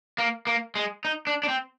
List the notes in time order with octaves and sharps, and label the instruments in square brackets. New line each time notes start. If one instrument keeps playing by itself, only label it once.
[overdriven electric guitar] A#3
A#3
G#3
D#4
D4
D4
C4